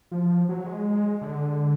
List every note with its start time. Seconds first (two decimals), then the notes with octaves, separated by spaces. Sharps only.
0.11 F3
0.49 F#3
0.66 G#3
1.22 D3